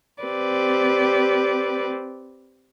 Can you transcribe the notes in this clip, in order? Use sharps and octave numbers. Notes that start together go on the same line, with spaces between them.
C4 G4 B4 D5